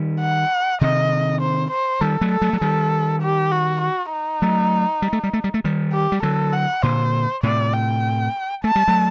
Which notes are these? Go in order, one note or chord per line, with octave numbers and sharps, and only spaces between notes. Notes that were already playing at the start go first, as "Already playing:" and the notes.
Already playing: D#3 G3
F#5
C3 D#3 D#5
C5
C5
D#3 G3 A4
F#3 A3
A4
F#3 A3
F#3
D#3 G3 A4
G4
F#4
F#4
D#4
F#3 A3
G3
A3
G3
A3
G3
A3
D#3 G3
G4
G3
D3 F#3 A4
F#5
A#2 D3 C5
A2 C3 D5
G5
A3 A5
G3
F#3 A3